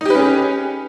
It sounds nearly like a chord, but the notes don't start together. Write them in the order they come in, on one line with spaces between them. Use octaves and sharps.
D#4 G4 B4 C#4 G#4